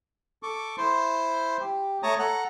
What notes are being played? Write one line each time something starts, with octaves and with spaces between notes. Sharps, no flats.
A4 C#6 D6
E4 C5 C6
G4
A3 C#5 A5 A#5 D#6
A4 F#5 A#5